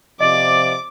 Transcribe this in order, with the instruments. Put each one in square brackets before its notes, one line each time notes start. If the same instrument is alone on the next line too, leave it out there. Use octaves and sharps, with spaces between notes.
[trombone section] C3 F3 [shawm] D5 [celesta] D#5 [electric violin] D6